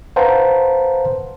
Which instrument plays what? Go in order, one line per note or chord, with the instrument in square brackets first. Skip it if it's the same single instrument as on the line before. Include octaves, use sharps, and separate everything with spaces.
[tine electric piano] B4 C5 F5 F#5 A5 A#5